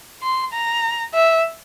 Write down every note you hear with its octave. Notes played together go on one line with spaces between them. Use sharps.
C6
A#5
E5